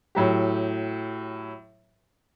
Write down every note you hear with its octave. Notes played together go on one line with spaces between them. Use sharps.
A2 F#3 G4